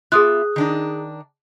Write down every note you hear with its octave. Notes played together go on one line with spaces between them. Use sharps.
B3 F4 G#4 E5 D#6 F#6
D#3 D4 D#4